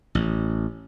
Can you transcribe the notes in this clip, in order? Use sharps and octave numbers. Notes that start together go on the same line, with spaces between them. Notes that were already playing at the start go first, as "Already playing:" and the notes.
A1